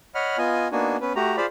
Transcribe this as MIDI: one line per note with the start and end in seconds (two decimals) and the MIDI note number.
0.15 0.37 73
0.15 0.37 75
0.15 0.37 78
0.15 0.37 83
0.15 0.37 89
0.38 0.68 59
0.38 0.68 65
0.38 0.68 75
0.38 0.68 80
0.72 0.97 58
0.72 0.97 59
0.72 0.97 62
0.72 0.97 63
0.72 0.97 66
0.72 0.97 80
1.01 1.13 59
1.01 1.13 61
1.01 1.13 71
1.16 1.36 57
1.16 1.36 66
1.16 1.36 67
1.16 1.36 82
1.37 1.46 65
1.37 1.46 68
1.37 1.46 72
1.37 1.46 74
1.37 1.46 77
1.37 1.46 83